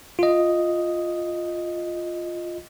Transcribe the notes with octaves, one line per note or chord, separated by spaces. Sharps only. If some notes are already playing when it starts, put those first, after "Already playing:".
F4 D#5